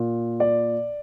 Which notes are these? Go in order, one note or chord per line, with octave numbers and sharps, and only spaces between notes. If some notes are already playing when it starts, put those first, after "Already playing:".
Already playing: A#2
D5